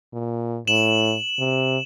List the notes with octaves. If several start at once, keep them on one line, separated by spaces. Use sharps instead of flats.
A#2
A2 E7 F#7
C3